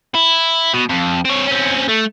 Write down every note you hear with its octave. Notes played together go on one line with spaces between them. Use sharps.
E4
B2
F2
C4 C#5
C4 C#4
A3